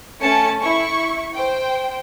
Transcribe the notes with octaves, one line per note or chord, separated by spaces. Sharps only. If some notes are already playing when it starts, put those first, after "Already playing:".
A3 C#4 A5 C#7
E4 C#6
C5 G5